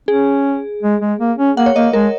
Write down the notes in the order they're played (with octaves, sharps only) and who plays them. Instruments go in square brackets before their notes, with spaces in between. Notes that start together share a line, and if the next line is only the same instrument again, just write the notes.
[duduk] C#4 [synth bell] G#4
[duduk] G#3
G#3
A#3
C#4
[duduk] A#3 [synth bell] F#5
[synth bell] C#5
[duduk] A#3 [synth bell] D#5
[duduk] G#3 [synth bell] A#4